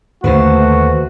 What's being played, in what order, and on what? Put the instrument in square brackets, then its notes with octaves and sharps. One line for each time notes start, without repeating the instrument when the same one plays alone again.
[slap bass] D#2 D3 [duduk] A3 [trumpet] F#4 [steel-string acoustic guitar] B4 C5